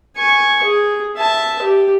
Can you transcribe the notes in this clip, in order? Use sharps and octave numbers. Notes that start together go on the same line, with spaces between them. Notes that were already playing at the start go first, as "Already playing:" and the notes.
G#5 C#6
G#4
E5 A5
G4